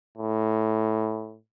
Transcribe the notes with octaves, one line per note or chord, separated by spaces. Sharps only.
A2